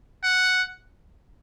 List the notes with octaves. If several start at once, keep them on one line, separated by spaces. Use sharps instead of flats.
F#5